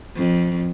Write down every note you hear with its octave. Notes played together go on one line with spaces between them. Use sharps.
F2